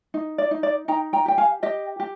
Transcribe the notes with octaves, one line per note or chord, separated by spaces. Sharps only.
D#4
D5
D#4
D5
D#4 G5 A#5
G5 A#5
G4 G5
F5 G#5
G4 D#5 G5
G4